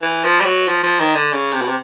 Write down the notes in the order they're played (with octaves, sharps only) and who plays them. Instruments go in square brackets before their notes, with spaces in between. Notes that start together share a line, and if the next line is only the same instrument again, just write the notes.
[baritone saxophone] E3
F3
G3
F#3
F3
F3
D#3
D3
C#3
C3
B2
C3